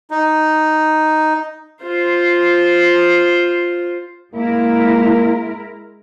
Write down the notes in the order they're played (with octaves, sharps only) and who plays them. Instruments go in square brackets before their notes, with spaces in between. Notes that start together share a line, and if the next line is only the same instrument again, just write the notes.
[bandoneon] D#4
[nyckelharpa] F4 C5
[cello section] G#3 E4 A#4 [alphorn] A#3